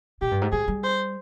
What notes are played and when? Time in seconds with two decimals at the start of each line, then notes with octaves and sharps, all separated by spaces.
0.22 A#2 G4
0.31 G2
0.42 G#2
0.52 G#2 G#4
0.68 G3
0.84 C5